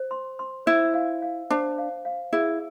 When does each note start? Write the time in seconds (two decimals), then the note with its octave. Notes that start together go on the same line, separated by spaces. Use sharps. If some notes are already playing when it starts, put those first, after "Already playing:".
Already playing: C5
0.11 C6
0.39 C6
0.66 E4 C5
0.94 F5
1.22 F5
1.50 D4 C5
1.78 F5
2.05 F5
2.33 E4 G#4